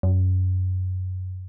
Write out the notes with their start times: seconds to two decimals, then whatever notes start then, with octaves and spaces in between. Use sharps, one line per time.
0.03 F#2